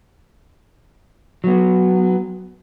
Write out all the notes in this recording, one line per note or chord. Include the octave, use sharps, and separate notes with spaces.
F#3 B3